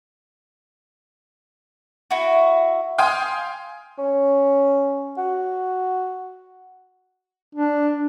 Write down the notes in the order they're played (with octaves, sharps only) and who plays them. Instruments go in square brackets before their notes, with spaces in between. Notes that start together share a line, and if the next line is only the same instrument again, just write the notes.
[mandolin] E4 F#4
[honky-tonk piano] F5 G5 G#5 C6 D#6
[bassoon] C#4
F#4
[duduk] D4